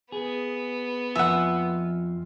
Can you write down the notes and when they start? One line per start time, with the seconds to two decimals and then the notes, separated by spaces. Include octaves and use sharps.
0.12 B3 G#4
1.16 F2 F4 E5 F#5 G#5